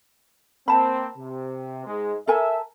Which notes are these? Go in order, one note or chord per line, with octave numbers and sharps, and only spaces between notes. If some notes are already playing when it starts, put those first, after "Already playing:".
A#3 C4 A5 B5
C3
G#2 G#3
A4 A#4 E5 G#5